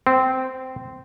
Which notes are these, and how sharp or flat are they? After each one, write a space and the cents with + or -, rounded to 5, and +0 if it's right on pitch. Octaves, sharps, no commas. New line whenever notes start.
C4 -10